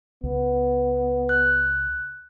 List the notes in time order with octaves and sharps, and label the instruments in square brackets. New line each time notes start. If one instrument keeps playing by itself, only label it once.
[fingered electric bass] C#2 [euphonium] B3
[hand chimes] F#6